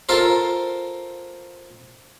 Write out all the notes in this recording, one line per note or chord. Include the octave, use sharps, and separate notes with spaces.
F4 A4 A#4 C5